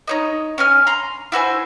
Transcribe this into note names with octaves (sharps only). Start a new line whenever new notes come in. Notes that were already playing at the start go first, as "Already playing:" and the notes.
D#4 C#5 D#5
C#4 G#5 F6
A#5 C6
E4 F#4 C5 G#5